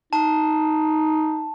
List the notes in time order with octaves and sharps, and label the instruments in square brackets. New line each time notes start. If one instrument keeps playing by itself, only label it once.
[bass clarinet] D#4 [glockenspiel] A5